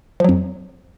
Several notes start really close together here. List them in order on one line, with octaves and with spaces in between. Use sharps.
F3 F#3 F2